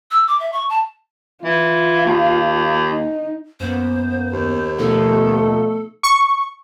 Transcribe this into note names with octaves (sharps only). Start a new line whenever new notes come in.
E6
D6
E5
C#6
A5
E3 F4
D#2
D#4
F#2 A#3 B3 C5
D#2
B2 F3 A3 D#4 A4
C#6